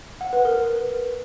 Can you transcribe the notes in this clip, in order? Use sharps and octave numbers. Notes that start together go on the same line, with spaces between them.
F#5
B4
A#4
B4